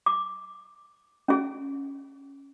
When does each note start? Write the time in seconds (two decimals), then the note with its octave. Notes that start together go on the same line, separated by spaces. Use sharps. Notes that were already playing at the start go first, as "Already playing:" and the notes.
0.06 D6
1.28 C#4 G#4